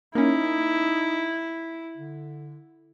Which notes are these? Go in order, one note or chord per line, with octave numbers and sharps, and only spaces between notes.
A#3 C#4 D#4 E4
D3